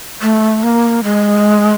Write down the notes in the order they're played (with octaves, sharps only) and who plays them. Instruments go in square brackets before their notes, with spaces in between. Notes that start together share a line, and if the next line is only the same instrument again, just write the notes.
[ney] A3
A#3
G#3